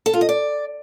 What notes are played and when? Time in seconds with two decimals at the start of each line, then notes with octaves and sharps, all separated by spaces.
0.06 A4
0.13 F4
0.21 D#5
0.29 D5